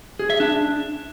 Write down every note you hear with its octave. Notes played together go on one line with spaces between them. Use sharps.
G#4
E5
D4